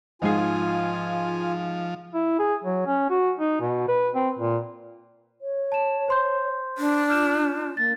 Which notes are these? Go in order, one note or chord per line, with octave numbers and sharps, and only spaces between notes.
G#1 G#2 F3 F4 G#4 G#5
E4
G#4
F#3
C#4
F#4
D#4
B2
B4
C4
A#2
C#5
A5 E7
C5 C6 G6
D4
F4 F6 G6 E7
A#3 A6